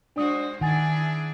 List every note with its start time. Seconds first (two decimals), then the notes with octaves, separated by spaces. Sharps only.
0.16 G#3 D4 F#4 C5 D5 D#6
0.61 D#3 D4 E4 G#4 F#5 G#5 A6